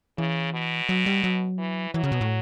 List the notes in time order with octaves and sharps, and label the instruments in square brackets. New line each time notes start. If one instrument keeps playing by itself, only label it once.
[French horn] C#3 [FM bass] E3
[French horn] B2
[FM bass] F#3
G3
F#3
[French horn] E3
[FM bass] E3 [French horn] F#3
[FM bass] C#3
B2
A2